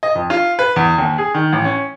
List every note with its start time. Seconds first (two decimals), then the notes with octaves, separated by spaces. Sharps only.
0.03 D#5
0.15 F2
0.30 F4
0.59 B4
0.76 E2
0.98 D#2
1.18 G#4
1.34 D#3
1.53 A1
1.65 C#4